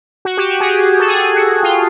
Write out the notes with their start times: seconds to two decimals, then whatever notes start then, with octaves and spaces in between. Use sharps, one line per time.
0.25 F#4
0.37 G4
0.49 F#4
0.60 G#4
0.66 G4
1.00 A4
1.08 G#4
1.35 F#4
1.63 F4